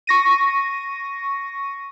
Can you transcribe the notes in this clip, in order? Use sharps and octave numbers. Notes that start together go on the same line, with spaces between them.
C#6 A#6 D#7